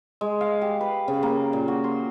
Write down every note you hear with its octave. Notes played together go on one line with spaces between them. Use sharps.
G#3
F5
G4
B4
C#3
A#3
A#2
F#4
C6